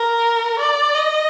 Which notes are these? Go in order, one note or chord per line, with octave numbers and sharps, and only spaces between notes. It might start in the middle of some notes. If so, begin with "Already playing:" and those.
Already playing: A#4
D5
D#5